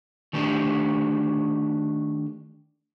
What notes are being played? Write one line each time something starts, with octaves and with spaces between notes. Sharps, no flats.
D#3 A3 D4 G4